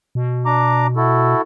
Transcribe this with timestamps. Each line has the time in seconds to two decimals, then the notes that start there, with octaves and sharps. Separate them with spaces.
0.15 B2
0.46 D4 A#5 D6
0.96 E4 F#4 A4